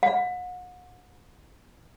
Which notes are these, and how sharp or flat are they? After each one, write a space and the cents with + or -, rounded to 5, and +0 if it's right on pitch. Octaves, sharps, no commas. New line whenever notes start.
F#5 -35